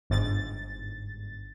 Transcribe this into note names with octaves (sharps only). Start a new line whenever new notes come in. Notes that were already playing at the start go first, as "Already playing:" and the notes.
G1 G#2 A6